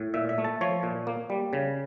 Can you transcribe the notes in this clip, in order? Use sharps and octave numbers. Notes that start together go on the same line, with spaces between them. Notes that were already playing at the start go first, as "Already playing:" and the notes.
Already playing: A2
A#2 E5
E5
A3
A5
F3 C#5
A#2
A#3
G3
C#3